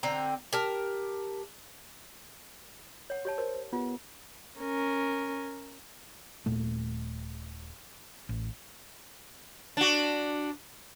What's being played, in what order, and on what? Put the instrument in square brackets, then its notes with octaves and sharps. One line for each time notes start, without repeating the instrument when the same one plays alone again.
[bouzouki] D3 C4 G5 A#5
G4 A#4 A5
[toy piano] C#5 F#5
G4 C#5 A5
[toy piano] A#4 [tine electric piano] C5
[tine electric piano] B3 G4 [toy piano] F4
[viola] C#4 A#4
[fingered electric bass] D#1 A#2 A3
A1
[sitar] D4 F#4